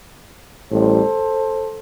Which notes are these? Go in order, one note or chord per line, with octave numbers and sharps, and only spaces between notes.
A1 A2 G3 A4 C5